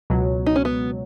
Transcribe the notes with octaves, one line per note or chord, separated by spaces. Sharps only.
C#2 B2 F#3
D#4
C#4
B3